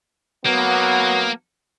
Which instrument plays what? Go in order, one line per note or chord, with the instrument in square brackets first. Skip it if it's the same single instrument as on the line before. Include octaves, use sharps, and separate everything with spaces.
[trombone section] F#3 B3 [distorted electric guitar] A#3